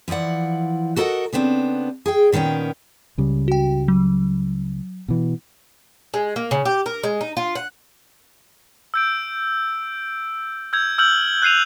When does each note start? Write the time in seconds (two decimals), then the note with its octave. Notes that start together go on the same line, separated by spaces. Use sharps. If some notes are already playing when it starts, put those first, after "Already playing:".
0.08 E3 F3 E4 D5 F#5
0.96 F#4 A4 A#4 C#5 D#5 F#5
1.33 C#3 B3 C4 D4
2.06 G#4 G5
2.32 A#2 D#3 B3 C#4 G5
3.18 C#2 C#3 G3
3.48 F#4 G5
3.88 F#3
5.08 B2 E3
6.14 G#3
6.36 A#3
6.51 C#3
6.65 G4
6.86 A#4
7.03 G#3
7.21 D#4
7.37 F4
7.55 F#5
8.94 E6 G6 D7
10.73 E6 G6 G#6
10.98 E6 F6 G6 F#7
11.42 F#6 G#6 C7 D#7 F7